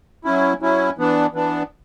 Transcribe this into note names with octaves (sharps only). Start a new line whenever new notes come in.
F#3 C#4 E4
F#3 C#4 E4
E3 B3 D4
E3 B3 D4